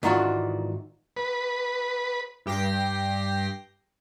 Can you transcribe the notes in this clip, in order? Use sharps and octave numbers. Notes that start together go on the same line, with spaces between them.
G#2 D#3 E3 D4 F4 F#4
B4
G2 G4 G5 A#6 C7